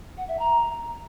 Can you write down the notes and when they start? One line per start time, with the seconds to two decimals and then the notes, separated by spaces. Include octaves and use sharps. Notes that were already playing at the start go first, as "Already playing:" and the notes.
0.17 F#5
0.28 E5
0.39 A#5